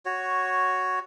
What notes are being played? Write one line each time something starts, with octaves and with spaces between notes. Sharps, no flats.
F#4 C#5